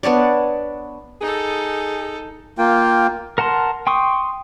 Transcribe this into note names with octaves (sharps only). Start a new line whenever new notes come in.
B3 D4 C#5 D5
D#4 G#4 A4
A#3 F4 G5
A#4 F#5 A5 C6
G5 C6 C#6 D#6